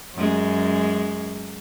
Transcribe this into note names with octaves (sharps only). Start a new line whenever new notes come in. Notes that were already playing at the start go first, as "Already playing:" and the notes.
F#2 G#3